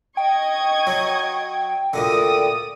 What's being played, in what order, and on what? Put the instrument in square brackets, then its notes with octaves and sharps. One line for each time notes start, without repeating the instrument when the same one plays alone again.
[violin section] D#5 C#6 G#6 [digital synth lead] G5
[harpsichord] F#3
[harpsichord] D2 A#2 D3 [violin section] D5 D#6